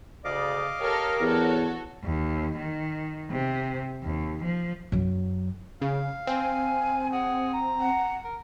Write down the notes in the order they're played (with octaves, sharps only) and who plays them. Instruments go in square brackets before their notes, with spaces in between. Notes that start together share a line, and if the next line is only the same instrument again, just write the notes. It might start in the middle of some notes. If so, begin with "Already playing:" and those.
[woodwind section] D2 C#3 D5 [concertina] D#5 F5 D6
[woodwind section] G4 A#4 [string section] A4 C#5 F6
[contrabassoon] E2 [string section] F#4 A4 C#5
[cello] D#2
D#3
C3
D#2
F3
[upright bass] F#2 F#3
[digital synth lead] C#3 [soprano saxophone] F5
[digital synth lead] C4 [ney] G#5
[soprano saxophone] G#4 [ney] F#5
[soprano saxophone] A#5
[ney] F#5
[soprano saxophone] A#4